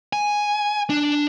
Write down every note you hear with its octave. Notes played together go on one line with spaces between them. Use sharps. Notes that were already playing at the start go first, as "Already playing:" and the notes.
G#5
D4